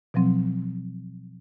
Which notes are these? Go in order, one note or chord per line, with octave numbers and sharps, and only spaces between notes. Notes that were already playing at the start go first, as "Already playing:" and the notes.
B2 F3 F#3 C4